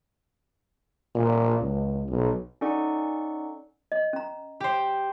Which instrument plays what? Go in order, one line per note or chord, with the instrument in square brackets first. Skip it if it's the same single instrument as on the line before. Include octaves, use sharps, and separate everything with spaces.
[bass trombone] A#2
C#2
B1
[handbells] C#4 D#4 A4 D5 F#5 C#6
[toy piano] D#5
C#4 A#5
[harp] G4 C5